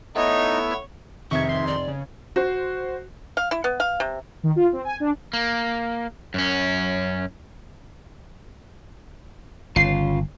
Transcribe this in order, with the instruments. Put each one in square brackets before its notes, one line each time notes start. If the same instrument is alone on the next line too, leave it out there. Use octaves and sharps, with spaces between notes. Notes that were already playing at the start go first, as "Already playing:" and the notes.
[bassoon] A3 [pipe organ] B3 E4 E6 [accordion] D#4 [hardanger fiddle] C#5
[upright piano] F1 G#6 [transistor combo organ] C3 D#3 [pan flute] E5 [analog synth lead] C#6
[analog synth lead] C6
[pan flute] D5
[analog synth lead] C#3
[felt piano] F#4 C5
[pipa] F5
E4
B3
F5
C3
[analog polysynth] D#3
F4
C4
G#5
D4
[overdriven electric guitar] A#3
F#2 C#4
[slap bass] G1 [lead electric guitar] C#3 F4 [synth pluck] C7